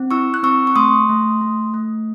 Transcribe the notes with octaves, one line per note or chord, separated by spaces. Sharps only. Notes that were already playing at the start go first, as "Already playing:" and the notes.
Already playing: C4
E4 C#6 E6
F#6
C4 C#6 E6
C#6
A3 C6 D#6
A3
A3
A3